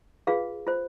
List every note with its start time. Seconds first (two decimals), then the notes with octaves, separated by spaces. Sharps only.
0.27 F4 G#4 B4 F5
0.67 F4 C5